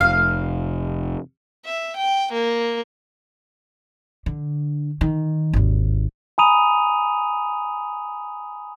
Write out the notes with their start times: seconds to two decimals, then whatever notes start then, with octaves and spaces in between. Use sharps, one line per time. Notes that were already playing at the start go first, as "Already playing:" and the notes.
0.01 F1 F5
1.66 E5
1.97 G5
2.33 A#3
4.26 D3
5.01 D#3
5.53 G#1 D#2
6.38 G#5 A#5 B5 D#6 D#7 F7